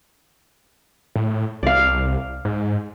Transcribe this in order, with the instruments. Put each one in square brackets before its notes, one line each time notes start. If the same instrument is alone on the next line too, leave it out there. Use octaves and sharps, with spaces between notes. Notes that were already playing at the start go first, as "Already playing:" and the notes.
[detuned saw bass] A2
[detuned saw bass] C2 [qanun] D5 F5
[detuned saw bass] G#2